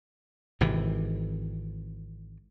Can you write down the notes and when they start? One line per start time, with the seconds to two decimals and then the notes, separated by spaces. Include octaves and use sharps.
0.61 G#1 C3 E3